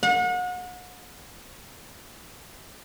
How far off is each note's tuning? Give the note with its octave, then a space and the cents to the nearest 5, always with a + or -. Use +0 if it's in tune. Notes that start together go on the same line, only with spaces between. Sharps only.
F#5 -35